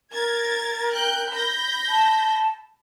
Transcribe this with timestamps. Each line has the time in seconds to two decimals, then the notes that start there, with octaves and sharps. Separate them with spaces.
0.12 A#4 G#6 A6
0.92 G5 F#6 G6
1.30 B5 G6 A#6
1.89 A5